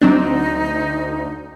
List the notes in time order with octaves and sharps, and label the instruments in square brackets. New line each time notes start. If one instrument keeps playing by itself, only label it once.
[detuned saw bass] D2 [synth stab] F#3 C4 D4 [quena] D#4